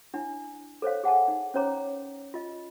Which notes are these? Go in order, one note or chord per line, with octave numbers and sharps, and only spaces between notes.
D4 E4 G#5
A4 C5 C#5 F5
G#4 F#5 G#5 A5
D#4
C#4 C5 C#5 A#5 D6
F4 D#5